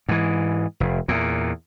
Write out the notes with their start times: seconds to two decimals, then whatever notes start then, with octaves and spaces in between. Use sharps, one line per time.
0.09 G#2 E3
0.80 F1
1.08 E2 A#2